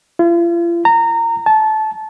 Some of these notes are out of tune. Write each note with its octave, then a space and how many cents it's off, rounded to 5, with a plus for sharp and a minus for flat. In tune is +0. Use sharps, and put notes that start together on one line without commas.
F4 -45
A#5 -20
A5 -20